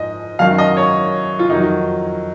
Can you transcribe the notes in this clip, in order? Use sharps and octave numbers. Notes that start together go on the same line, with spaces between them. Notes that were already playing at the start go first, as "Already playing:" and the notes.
Already playing: G#2 F3 D#5
F#2 D#3 F#3 F5
D#5
C#5
F4
F2 D#3 F#3 D#4